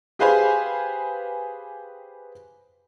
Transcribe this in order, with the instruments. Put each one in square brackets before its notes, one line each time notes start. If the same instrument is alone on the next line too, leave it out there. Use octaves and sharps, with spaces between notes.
[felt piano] G4 G#4 B4 C5 F5 G#5